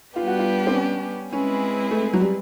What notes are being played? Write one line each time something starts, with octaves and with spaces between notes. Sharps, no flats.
G3 B3 D4 F4 G4 B4
F#4
F4
C4
C#4
G#3 C4 C#4 E4 G#4 B4
A3
F#3
G3